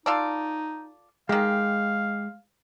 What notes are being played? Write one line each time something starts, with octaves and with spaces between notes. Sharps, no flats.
D#4 F4 A4 D5
D#3 G#3 G4 F5